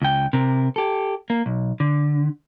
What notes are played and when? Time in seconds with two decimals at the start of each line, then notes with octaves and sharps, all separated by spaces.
0.02 C#2 G5
0.33 C3 A#4
0.76 G4 A4
1.30 A#3
1.46 B1
1.80 D3